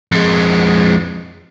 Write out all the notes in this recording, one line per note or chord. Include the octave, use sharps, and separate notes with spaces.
F2 G#3